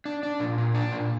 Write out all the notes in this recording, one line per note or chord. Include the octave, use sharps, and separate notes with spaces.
D4
D4
A#2
A#2
D4
A#2